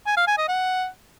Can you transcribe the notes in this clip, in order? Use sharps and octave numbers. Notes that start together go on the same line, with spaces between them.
G#5
F5
G#5
D#5
F#5